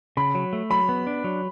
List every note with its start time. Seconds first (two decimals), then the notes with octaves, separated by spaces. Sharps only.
0.17 C#3 B5
0.35 F#3
0.53 A3
0.70 F#3 B5
0.89 B3
1.07 D4
1.24 F#3